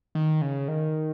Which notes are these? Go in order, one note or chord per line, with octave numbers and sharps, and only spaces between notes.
D#3
C#3
D#3